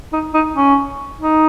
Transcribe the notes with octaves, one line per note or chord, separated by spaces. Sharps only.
D#4
D#4
C#4
D#4